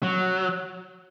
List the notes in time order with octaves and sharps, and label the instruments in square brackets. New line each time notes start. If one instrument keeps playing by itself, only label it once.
[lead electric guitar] F#3